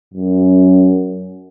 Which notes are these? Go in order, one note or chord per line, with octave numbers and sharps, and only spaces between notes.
F#2